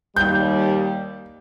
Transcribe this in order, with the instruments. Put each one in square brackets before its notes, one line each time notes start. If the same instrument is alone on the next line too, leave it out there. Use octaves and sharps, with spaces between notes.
[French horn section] D#2 G3 [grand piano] G6